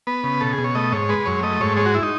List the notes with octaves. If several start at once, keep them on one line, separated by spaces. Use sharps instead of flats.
B3 B4
C#3
B2 A4
G#4
B2
C#5
A3 D#5
G#2 C#5
G#3 B4
F#2 C#5
A3 D#5
G#2 C#5
G#3 C#5
F#4
E4
D#4